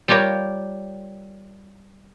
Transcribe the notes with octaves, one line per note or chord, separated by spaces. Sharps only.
G3 F4 G4 A#4 C#5